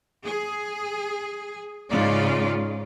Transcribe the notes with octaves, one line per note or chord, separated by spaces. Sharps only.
G#4
G#2 C#3 F4 D5